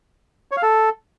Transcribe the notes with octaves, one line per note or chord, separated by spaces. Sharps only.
C#5
F5
A4